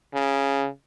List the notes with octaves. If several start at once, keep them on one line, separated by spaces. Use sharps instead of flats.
C#3